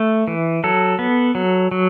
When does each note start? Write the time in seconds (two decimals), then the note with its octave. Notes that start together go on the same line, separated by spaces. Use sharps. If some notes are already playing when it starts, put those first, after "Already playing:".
Already playing: A3
0.28 E3
0.64 F#3 A4
0.99 B3
1.35 F#3
1.71 F#3